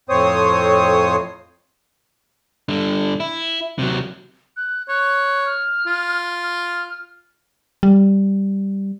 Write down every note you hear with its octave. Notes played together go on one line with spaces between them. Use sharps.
F2 A2 C4 C5 C#5 D#6
G2 D3
E4
C3 F#3
F#6
C#5 F#6
F6
F4
F6
G3